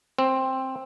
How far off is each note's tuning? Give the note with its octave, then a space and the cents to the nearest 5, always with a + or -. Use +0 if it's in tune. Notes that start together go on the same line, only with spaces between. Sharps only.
C4 +10